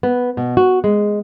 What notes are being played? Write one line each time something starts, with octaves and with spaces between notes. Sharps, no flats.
B3
B2
F#4
G#3